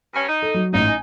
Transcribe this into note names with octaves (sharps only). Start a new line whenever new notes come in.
G2 C#4
D#4
A4
F#3
A1 G#2 D#4
G#5